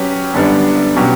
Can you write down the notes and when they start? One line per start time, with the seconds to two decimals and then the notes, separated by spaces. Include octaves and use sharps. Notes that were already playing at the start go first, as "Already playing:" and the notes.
Already playing: F#3 C#4 G4 B4
0.34 F#2 D3 G3 B3 D4
0.96 B2 F#3 C#4 G4